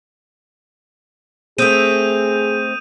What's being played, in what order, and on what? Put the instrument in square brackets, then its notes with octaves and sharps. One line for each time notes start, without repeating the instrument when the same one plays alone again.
[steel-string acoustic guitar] A3 C4 [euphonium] G#4 [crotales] D#6 G6 D#7